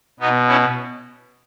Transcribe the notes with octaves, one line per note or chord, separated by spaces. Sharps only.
B2 B3 D#4
C#4 E4